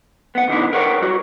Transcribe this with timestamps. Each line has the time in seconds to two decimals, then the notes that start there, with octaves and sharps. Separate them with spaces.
0.35 B3 F#5
0.48 B2 D#3 D4 E4
0.73 A#4 B4 C#5 E5 F#5 G5
1.01 G3 F#4